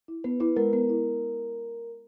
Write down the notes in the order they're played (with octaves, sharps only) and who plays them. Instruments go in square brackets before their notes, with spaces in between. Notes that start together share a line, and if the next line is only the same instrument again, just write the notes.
[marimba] E4
[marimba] B3 [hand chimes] B4
[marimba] E4 [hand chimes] B4
[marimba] G#3 [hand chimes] A#4
[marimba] B3 [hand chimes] A#4
[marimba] E4